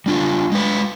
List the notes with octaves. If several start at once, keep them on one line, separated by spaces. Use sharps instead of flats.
G3 D4 F4
G#3 B4